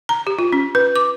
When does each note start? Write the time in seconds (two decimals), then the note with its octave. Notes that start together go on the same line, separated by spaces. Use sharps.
0.09 A#5
0.27 G4
0.39 F4
0.53 C#4
0.75 B4
0.96 D6